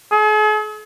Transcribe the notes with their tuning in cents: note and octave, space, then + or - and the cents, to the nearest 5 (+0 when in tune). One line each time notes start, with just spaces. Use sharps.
G#4 +45